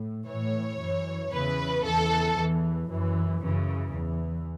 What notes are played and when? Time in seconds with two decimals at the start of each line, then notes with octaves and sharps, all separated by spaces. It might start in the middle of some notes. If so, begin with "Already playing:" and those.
Already playing: A2
0.27 A2 E3 C#5
0.79 F#2 E3
1.31 E2 C#3 E3 B4
1.84 E2 E3 A4
2.37 E2 E3
2.89 F#2 E3
3.41 F#2 C#3 E3
3.94 E2 E3